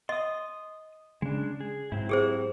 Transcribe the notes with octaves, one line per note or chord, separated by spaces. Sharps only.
D#5 C6 D#6
C#3 G#3 D4
G#4
G#2 F#3 C4 E4
G4 G#4 C5